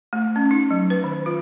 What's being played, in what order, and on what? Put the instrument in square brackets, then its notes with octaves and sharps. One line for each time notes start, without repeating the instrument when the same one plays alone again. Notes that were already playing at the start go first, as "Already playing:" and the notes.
[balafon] A3
C#4
D#4
F#3
B4
D#3
F4